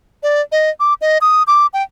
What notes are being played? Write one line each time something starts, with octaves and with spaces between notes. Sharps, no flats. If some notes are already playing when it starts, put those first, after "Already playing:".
D5
D#5
D6
D#5
D#6
D6
G5